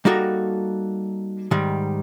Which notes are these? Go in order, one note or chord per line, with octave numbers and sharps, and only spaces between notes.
G3 A#3 D#4 F#4 A4
G#2 D#3 G3